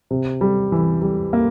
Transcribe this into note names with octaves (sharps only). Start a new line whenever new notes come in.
C3
G3
E3
G3
A#3